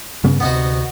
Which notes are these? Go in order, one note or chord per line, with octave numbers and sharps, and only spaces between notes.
G2 C#3 B3
D2 C3 B3 D#4 F#4